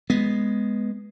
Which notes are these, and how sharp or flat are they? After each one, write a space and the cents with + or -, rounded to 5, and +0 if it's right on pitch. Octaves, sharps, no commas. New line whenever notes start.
G#3 +0 B3 +0